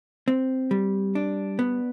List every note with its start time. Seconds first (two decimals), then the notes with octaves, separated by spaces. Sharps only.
0.28 C4
0.71 G3
1.15 D4
1.59 B3